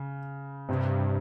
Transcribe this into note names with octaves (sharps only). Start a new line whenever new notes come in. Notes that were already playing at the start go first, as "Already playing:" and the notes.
Already playing: C#3
G2 C3